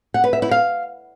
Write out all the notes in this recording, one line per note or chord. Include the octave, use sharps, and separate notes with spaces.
F#5
B4
E5
E4
F5